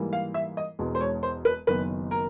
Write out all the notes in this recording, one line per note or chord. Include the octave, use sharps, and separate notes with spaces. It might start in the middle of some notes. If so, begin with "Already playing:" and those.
Already playing: G#2 E3 G3 A#3
F5
E5
D#5
E1 E2 B2 G#3
C5
C#5
C5
B4
F#1 F#2 D#3 F#3 B3 B4
A#4